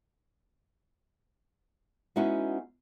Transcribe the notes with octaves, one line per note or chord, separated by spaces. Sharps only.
G#3 B3 C#4 D#4 E4 F#4